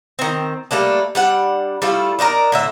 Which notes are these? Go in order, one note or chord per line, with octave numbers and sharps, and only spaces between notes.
D#3 C4
G3 A3 A#3 D4
G3 D4 F#5
G3 A3 E4 F4
D4 D#4 F4 A#4
A2 D3 E5